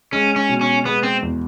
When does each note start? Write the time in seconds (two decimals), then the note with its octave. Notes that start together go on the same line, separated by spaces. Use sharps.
0.12 G#3 C#4
0.36 C#4
0.49 B2
0.61 C#4
0.85 G#3 B3
1.03 C4
1.23 E2